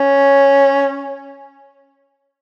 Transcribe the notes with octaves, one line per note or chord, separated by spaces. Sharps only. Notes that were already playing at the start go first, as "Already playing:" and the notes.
Already playing: C#4